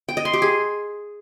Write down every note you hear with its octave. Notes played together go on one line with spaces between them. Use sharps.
G5
D#5
C6
G4
G#4